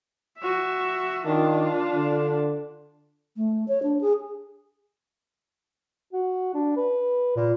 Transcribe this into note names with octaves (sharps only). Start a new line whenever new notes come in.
F#4 E5
D#3 D4 F4
D3
A3
C#5
D4
G#4
F#4
D4
B4
A#2